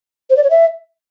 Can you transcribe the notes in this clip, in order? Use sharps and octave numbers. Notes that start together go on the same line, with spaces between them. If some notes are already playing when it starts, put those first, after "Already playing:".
C5
D5
C#5
E5